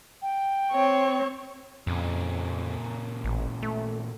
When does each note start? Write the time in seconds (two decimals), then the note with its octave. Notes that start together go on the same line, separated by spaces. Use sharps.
0.22 G5
0.72 C4 C#5
1.87 F2 A#2 C#3
3.24 A1
3.63 A3